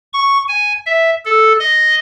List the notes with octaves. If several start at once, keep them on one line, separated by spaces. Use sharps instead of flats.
C#6
G#5
E5
A4
D#5